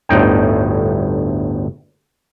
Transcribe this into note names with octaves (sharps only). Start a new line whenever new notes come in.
G1 D2 A2 D#4 G5